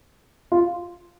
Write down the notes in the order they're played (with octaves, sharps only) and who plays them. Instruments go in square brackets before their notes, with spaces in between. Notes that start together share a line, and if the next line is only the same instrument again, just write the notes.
[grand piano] F4